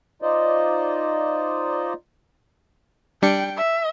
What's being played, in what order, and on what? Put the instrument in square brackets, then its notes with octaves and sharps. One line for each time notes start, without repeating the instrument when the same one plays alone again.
[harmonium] D#4 F4 C5 D5 D#5
[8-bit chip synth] G3 D4 C#7 [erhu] G5
[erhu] E5